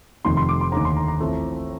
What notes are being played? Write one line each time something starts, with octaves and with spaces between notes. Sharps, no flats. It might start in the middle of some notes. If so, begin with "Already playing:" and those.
F1 F2 C3 D#3 C6
C6
D6
C6
D#2 D3 A3 D#4 A#5
C6
A#5
A#5
A1 A2 A3 C4 F4